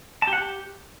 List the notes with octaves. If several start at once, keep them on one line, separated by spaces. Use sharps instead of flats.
A5
G4
F#5
G4